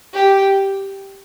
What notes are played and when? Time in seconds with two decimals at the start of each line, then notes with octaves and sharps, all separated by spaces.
0.14 G4